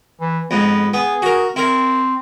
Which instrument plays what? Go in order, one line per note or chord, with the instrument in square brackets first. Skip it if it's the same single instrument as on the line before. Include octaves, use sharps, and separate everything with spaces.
[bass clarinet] E3
[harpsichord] F2 G#2 [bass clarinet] B3
[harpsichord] B3 [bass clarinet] G#4
[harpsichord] F#4 A#4
[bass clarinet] C4 [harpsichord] E4 A#4